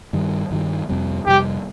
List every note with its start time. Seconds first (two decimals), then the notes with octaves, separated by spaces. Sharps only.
0.13 G2 D#3 G3
0.51 G2 D#3 G3
0.89 F2 C3 G3
1.26 F2 C3 G3 G4